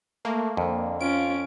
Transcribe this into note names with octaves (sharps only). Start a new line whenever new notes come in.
A3 A#3
F2 D3
C#4 F4 D7